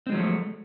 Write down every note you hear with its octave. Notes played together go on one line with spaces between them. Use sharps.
F3 F#3 G#3 A3 C4